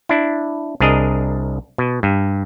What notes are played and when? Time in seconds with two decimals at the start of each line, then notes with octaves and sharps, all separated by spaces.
0.09 D4 E4
0.80 C2 D4 G#4 A#4 D#5
1.78 B2
2.03 G2